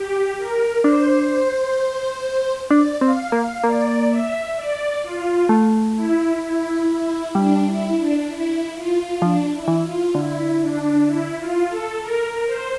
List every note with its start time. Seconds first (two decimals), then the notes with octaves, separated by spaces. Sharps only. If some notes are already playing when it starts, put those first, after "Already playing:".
Already playing: G4
0.38 A#4
0.84 D4 C5
2.70 D4 D5
3.01 C4 F5
3.32 A#3 F5
3.64 A#3 D5
4.09 E5
4.57 D5
5.03 F4
5.49 A3
5.96 E4
6.43 E4
6.88 E4
7.35 G3 D4
7.67 E4
7.98 D4
8.29 E4
8.76 F4
9.22 F3 D4
9.52 E4
9.68 E3
9.83 F4
10.15 D3 E4
10.61 D4
11.07 E4
11.38 F4
11.69 A4
12.00 A#4
12.46 C5